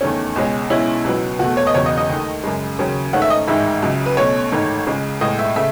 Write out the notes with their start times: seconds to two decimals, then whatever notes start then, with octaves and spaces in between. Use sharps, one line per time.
0.01 E2 D#3 A3 C#4
0.36 C#2 B2 G#3 C#4
0.70 B1 B2 G#3 C#4 E4
1.04 C#2 B2 F#3 B3
1.39 E2 B2 A3 F#4
1.57 C#5
1.67 D#5
1.74 E1 E2 C#3 F#3 C#4 C#5
1.86 D#5
1.97 D#5
2.09 D#2 D#3 A3
2.43 F#2 C#3 G#3
2.79 D#2 C#3 F#3 C#4
3.13 G#2 D#3 A3 C#4 F#5
3.22 E5
3.30 D#5
3.48 A1 G#2 D#3 G#3 E5
3.82 C#2 C#3 F#3
4.06 B4
4.17 B1 B2 A3 C#4 C#5
4.52 A1 G#2 D#3 A3
4.87 C#2 C#3 G#3
5.21 B1 A2 G#3 D#5
5.39 E5
5.56 C#3 A3 E5